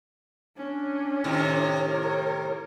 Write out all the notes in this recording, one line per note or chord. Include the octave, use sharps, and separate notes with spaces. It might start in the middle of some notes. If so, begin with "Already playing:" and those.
C#4 D4
A2 C3 D#3
A#4 C#5